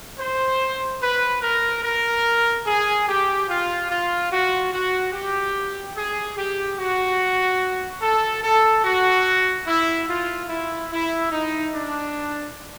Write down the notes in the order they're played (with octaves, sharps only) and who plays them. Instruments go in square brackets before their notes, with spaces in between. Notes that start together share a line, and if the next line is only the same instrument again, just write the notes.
[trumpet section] C5
B4
A#4
A#4
G#4
G4
F4
F4
F#4
F#4
G4
G#4
G4
F#4
A4
A4
F#4
E4
F4
E4
E4
D#4
D4